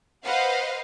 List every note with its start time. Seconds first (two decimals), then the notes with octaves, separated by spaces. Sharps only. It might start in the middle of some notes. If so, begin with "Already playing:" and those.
0.24 B4 C5 D#5 F5 F#5